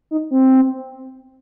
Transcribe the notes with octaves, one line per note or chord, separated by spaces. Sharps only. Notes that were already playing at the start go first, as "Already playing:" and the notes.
D#4
C4